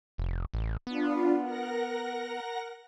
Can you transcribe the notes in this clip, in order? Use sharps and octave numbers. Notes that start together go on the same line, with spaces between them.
F1
A1
B3 D4 F4
A#4 F#5 A#6